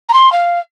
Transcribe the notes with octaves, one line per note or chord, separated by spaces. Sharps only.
A#5
C6
F5